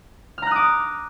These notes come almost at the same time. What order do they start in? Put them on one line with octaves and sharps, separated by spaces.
F6 A#5 F#6 D#6 D6